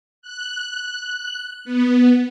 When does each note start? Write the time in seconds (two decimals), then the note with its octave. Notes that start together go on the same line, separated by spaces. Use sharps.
0.22 F#6
1.65 B3